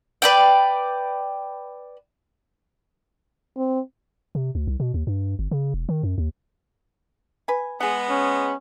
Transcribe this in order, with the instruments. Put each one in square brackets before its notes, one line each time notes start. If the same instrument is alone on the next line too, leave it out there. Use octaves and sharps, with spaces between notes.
[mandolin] B4 D5 G5
[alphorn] C4
[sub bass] C3
D2
C2
B2
D#2
G2
G1
C#3
E1
D#3
F#2
D#2
[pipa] B4 G#5
[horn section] G#3 B3 [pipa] G#4 F#5
[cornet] C#4